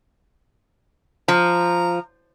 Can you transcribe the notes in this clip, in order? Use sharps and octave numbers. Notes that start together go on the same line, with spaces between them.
F3 A#5